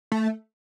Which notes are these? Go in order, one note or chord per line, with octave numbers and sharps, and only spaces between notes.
A3